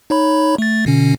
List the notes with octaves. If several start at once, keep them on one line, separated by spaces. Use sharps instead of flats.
D#4 C#5 B5
A3 A6
B2 D3 C#4